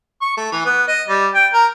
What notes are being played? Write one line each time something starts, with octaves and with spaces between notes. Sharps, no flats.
C#6
A3
E3
B3
D#5
G3
G5
A#4